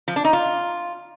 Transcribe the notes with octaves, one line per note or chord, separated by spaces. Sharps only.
F3
D4
D#4
F4